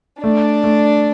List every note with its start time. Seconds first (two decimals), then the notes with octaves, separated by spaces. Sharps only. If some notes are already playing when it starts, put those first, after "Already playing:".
0.23 A3 D4 D5
0.64 A3